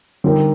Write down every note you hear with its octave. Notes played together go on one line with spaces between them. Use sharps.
D3 G3 C4 D#4 G4 A#4